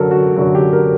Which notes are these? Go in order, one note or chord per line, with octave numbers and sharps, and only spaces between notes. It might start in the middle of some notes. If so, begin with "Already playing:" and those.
Already playing: F#2 D3 F#3 A4 A#4
F#4
F#2 D3 F#3 F#4
G4
A#4